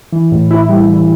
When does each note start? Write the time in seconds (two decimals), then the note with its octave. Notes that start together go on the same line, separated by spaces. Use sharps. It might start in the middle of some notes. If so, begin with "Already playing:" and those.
0.12 E3
0.32 A2
0.51 E4
0.69 G3
0.88 E3